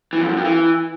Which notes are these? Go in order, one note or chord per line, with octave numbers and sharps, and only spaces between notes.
E3
F2
F#2
F2
E3